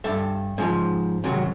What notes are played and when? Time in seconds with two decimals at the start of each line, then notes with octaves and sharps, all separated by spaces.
0.04 G2 A4 E5
0.58 G#2 F3
1.24 G#2 C3 D#3 F#3